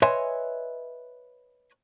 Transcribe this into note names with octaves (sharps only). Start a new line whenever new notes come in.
B4 C#5 D#5 E5 G#5 C6